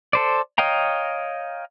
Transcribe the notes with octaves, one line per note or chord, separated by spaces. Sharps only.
A4 C5 D5
C#5 D#5 F5 G5 A#5